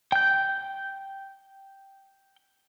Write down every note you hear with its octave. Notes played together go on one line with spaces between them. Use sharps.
G5 G6